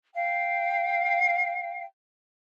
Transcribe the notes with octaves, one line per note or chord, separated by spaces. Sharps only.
F5 G5